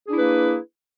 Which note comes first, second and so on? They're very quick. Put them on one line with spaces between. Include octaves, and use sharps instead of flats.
G#4 D4 E4 B4 A#3